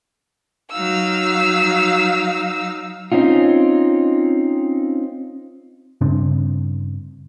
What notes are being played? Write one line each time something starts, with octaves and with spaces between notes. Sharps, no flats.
F#3 D#4 F5 E6
C4 C#4 D#4 F4
G2 C#3 C4 D4